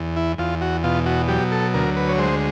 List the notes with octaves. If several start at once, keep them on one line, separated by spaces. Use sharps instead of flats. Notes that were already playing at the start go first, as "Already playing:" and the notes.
Already playing: E2
E4
E2 F4
F#4
B2 F4
F#4
F#3 G4
A4
D2 A#4
B4
C#5
G#3 C5